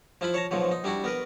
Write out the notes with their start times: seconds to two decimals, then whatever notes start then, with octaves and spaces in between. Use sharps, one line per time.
0.21 F3 E4 F4 B5
0.34 C#5 A5 A#5
0.51 G#2 B2 F3 F#3
0.71 D#4
0.84 G3 D4 E4 F#4
1.04 B3 A#4 B4